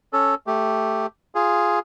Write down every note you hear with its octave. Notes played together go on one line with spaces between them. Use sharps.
C#4 A4
A3 G4
F4 G#4